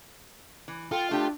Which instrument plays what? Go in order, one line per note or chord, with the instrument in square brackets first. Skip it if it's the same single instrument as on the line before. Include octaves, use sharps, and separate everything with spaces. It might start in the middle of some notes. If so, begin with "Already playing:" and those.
[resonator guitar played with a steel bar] E3
[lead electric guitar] F4 [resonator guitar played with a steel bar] A4 [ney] G5
[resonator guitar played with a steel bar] A3 G4 [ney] D4